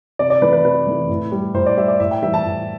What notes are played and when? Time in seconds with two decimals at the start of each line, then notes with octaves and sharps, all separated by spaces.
0.19 C3 D5
0.30 D5
0.42 E3 A3 B4
0.53 B4
0.64 C3 B4
0.87 E3 A3
1.09 A2
1.32 G3
1.54 A2 C5
1.66 D5
1.77 G3 E5
1.88 D5
2.00 A2 E5
2.11 G5
2.22 E3 G3 E5
2.34 A5
2.45 A2